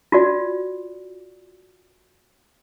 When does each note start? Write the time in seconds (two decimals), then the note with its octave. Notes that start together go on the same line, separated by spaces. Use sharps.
0.12 F4 F#4 D5